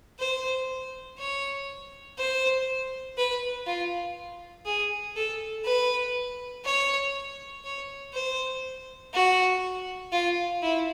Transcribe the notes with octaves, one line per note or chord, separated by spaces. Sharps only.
C5
C#5
C5
B4
F4
G#4
A4
B4
C#5
C#5
C5
F#4
F4
E4